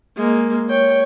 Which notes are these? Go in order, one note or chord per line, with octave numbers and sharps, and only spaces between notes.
G#3 A#3
C#5 G5